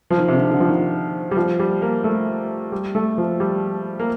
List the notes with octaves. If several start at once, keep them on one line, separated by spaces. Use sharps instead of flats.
F3
D#3
C3
D3
D3
F3
D#3
G3
F3
G3
A#3
A3
G3
A3
F3
G3
A#3